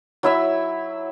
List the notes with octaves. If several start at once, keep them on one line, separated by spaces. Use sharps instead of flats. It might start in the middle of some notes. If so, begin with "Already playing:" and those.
F#3 E4 E5